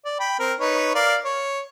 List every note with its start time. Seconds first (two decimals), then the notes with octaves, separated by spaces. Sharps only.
0.05 D5
0.20 G5 B5
0.39 C4 A#4
0.60 D#4 B4 C#5
0.95 A#4 D5 F5
1.25 C#5